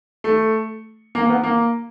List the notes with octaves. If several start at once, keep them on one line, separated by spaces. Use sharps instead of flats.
A3
A#3
A#3
B3
A#3